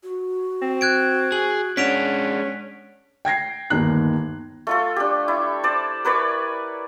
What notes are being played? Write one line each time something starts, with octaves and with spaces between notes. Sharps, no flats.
F#4
C4
F#6 G#6 D7
G#4 F#7
G#3 C#4 D4 F#5 B6 D7 F7
G5 G#6 A#6 C7
G1 D#2 D#3 A#5 F#6
A3 F4 A4
D4 G4
E4
C5 D5 E6
A#4 B4 C#5 D5